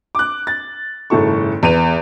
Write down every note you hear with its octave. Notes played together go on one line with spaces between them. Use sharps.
D6 F#6
A6
F#1 G#2 D#3 E4 A4 C#6
E2 B4 D#7 F7